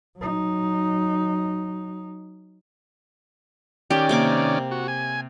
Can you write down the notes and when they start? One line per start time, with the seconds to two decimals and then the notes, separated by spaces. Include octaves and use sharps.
0.17 F#3 D#4
3.90 D#3 C#4 G4 D5
4.09 C3 A#3 D6
4.71 F#4
4.88 G#5